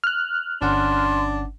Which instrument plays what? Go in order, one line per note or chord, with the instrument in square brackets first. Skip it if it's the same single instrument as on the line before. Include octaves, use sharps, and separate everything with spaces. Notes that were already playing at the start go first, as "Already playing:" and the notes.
[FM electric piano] F6 F#6
[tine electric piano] G1 C#4 F#5 [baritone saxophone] D4 [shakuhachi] C6